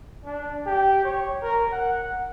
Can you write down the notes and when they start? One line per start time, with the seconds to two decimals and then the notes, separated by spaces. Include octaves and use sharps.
0.25 D4
0.66 G4
1.05 C#5
1.42 A#4
1.72 F#5